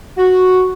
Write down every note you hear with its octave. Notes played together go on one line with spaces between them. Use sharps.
F#4